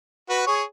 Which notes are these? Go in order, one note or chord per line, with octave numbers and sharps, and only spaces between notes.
F#4 B4
G#4 C#5